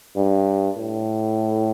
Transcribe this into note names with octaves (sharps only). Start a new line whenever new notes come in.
G2
A2